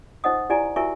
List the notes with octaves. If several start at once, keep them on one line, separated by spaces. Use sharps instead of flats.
D#4 C5 D#5 F#5 D#6
E4 G4 D5 G#5 A#5
E4 F#4 A#4 E5 G#5 C#6